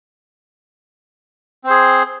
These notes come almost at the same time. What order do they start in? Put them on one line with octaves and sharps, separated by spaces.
C4 C5 G#4